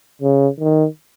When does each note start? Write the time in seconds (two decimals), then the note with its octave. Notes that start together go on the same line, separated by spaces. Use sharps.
0.22 C#3
0.60 D#3